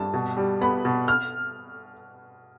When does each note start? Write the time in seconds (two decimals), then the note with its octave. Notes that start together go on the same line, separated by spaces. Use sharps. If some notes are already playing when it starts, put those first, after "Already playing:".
Already playing: G2 A5
0.14 B2
0.37 G3
0.61 B3 B5
0.85 B2
1.08 F6